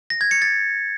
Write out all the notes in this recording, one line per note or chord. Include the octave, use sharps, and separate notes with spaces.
A#6
G#6
C#7
A6